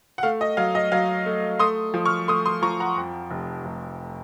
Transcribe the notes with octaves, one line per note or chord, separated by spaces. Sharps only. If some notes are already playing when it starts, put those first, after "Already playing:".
F#5
A3 F5
D#5
F#3 F5
D#5
F#3 F5
A3
A3 C6 D#6
F3
C#6 F6
A3 C6 D#6
C6 D#6
F3 A#5 C#6
F#5 A#5
F2
F1
F1